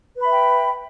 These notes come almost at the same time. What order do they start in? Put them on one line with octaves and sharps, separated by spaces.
B4 B5 E5 G5